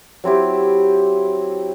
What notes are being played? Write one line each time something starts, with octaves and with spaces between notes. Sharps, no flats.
F#3 C4 E4 G4